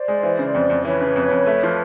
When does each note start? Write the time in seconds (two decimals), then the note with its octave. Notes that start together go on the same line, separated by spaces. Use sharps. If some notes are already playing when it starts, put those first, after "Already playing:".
Already playing: C5 D5
0.08 G#3
0.23 E3
0.39 C#3
0.55 F2
0.70 F2
0.85 E3 B4 C#5
1.01 C#3
1.16 F2
1.31 F2
1.47 A3
1.63 F3